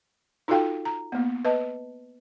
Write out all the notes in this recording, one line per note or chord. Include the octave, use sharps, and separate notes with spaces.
D#4 F4 F#4 A4 F5 G5
A#5
A#3 B3
B4 D#5 A5